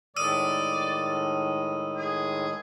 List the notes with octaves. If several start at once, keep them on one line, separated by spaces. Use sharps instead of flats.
A2 D#3 G#3 D5 D#6 E6 D#7
G#4